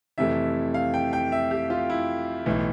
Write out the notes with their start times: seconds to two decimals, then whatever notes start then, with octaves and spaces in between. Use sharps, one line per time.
0.18 F2 C3 E3 A3 E5
0.74 F5
0.94 G5
1.13 G5
1.32 E5
1.51 G4
1.70 F4
1.90 E4
2.46 B1 A2 E3